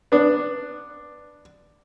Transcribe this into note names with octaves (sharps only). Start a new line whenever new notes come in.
B3 D4